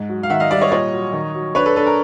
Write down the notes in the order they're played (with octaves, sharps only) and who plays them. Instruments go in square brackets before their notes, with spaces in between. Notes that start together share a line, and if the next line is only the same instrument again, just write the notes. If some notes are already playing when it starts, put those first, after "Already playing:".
Already playing: [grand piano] G#2
F#3
F5
D#3 E5 F#5
D#5 F5
G3 D5 E5
C#5 D#5
A#2 C#5 D#5
F#3
D#3
F#3
D4 B4 C#5
A4 B4
D4 A4 B4
A#4